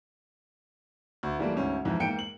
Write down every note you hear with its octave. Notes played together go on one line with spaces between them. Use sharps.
D2
E3 G3 A3 A#3
D2 G#2 C#4
F2 G#2 E3
G#2 A#3 G5 C#7 D7
F#7